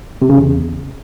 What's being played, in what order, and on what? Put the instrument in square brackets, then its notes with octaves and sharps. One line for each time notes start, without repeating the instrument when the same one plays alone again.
[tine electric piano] C3
C#3
E2